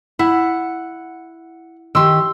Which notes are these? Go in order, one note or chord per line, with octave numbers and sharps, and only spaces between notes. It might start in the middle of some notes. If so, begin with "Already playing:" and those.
E4 F#5
D#3 G4 C6 E6